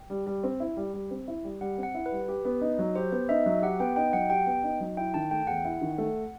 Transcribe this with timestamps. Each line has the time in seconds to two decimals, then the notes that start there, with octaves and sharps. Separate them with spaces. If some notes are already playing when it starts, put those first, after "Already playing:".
Already playing: G5
0.10 G3
0.27 G3
0.44 C4
0.60 E4
0.77 G3
0.94 G3
1.11 C4
1.28 E4
1.44 G3
1.61 G3 F#5
1.78 C4
1.83 F#5
1.95 E4
2.06 B4
2.12 G3
2.28 G4
2.45 B3
2.61 D#4
2.79 F#3
2.95 G4 C5
3.12 B3
3.29 D#4 E5
3.46 F#3
3.62 G4 F#5
3.80 B3 G5
3.96 D#4 G5
4.13 F#3 F#5
4.30 G4 G5
4.47 B3
4.64 D#4
4.80 F#3
4.97 E4 G5
5.14 D#3 A5
5.31 A3 G5
5.47 E2 F#5
5.65 E4
5.81 D#3
5.98 A3